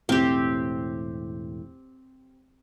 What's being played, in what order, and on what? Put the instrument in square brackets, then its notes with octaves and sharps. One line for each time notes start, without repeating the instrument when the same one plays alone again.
[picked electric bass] E1 A2 [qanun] C4 G4